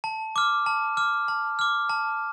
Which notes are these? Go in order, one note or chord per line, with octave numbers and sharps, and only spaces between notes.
A5
D6 F6
A5
D6 F6
A5
D6 F6
A5